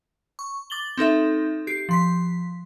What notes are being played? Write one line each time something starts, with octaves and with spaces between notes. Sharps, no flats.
C#6
D6 A6 F#7 G7
C4 D#4 A4 E5
G4 C7
F3 C6 B6